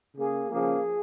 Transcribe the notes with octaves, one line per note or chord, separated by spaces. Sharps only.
C#3 A#3 G#4
C#3 F3 A#3 G#4